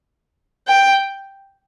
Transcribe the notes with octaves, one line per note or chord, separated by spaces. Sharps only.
G5